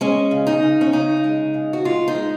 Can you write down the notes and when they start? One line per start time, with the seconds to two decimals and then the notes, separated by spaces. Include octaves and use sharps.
0.01 G#3 C#4
0.31 C#3
0.47 D#4
0.63 C#3
0.81 C#4
0.93 C#3 D#4
1.24 G#3
1.54 C#3
1.73 F#4
1.84 G#3 F4
2.08 D#4
2.15 G#3